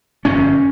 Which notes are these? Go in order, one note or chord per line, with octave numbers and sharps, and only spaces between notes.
G1 F2 C3 C#4